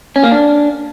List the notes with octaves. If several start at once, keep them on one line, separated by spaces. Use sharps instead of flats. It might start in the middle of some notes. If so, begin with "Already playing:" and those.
C#4
A#3
D4